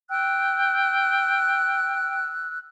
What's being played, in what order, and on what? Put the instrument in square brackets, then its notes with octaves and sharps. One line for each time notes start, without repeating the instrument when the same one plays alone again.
[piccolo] G5 [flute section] E6 F#6